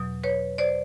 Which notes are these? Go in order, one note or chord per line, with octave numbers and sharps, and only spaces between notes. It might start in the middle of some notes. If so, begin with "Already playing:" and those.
Already playing: E2 B2 F#3
B4 C#5
C5 D5